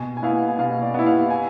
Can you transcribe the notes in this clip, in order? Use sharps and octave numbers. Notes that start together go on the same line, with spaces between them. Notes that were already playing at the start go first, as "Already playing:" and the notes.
Already playing: B2 G#5
G#5
B3 E4 F5
G#5
B2 F5
D5
B3 E4
F5
G#5